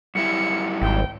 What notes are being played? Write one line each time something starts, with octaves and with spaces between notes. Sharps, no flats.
F#2 G3 E4 C#7
G#1 G5